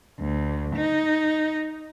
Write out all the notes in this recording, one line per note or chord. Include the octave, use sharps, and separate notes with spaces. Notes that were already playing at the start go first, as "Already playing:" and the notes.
D2
D#4